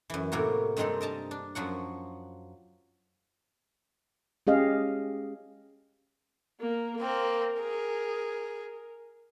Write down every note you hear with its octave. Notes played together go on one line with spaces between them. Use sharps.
F#2 E3
A2 C3 A#3 E4 F#4
G2 D#3 G#3 C4 D#4 A4
A#4 D#5 A5 A#5
D4
F#2 F3 F#3 F#5
G#3 C#4 G4 G#4 D#5 F5
A#3 A#4
A#3 C4 A#4
G#4